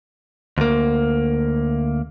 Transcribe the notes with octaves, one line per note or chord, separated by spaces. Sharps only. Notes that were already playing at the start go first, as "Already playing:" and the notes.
D2 A#3